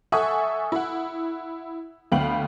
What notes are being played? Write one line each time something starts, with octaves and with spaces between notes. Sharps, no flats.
A4 E5 F#5 G#5 C#6 D#6
E4 F#5
D2 B3 F5 G5 F#7